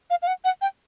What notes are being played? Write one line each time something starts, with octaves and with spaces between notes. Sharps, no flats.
F5
F5
F#5
F#5
G5